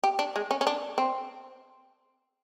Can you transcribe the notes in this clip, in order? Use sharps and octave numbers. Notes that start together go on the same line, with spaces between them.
G4
D4
G#3
C#4
C#4
D4
C4